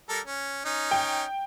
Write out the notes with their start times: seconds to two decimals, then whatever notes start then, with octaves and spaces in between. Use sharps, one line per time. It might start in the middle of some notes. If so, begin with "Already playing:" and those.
0.09 G3 A4 A#4
0.25 C#4
0.65 C#4 D#4
0.91 G5